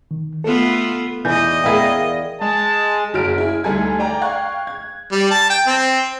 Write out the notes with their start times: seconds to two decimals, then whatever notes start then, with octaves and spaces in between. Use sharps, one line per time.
0.11 D#3
0.44 A3 B3 F4 A4
1.25 E2 E3 D5 D#5 G6
1.64 B3 E4 G#4 A#4 F5 G5
2.41 G#3 A5
3.13 F#1 F#3 G#4 F6 D7
3.38 E4 G#4
3.64 D2 G3 D#4 A4 G#5 G#6
3.99 D5 G5 A#5
4.21 F5 G5 C#6 F#6 G#6
4.67 G#6
5.12 G3
5.31 A5
5.50 G5
5.67 C4